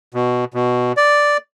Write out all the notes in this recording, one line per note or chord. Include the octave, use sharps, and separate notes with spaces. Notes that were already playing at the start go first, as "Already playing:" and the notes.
B2
B2
D5